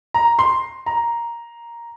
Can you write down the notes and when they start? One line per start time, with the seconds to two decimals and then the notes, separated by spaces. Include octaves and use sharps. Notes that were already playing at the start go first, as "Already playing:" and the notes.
0.14 A#5
0.39 C6
0.86 A#5